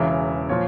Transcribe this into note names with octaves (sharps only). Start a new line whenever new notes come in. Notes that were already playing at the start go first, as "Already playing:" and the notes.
Already playing: E1 E2 C#3 E3 E5
A#2 F3 C#5